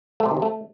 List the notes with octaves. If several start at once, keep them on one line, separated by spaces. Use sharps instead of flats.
A3
C3
D#3
C3
A3